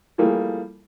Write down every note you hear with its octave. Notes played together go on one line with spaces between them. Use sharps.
E3 F3 G3 A3 A#3 G#4